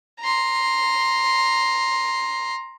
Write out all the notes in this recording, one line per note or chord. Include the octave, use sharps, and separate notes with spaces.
A#5 C6